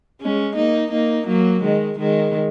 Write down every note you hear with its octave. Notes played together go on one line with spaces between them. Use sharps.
G#3 C#4
A#3 D#4
A#3 D#4
F#3 A#3
D#3 G#3
D#3 G#3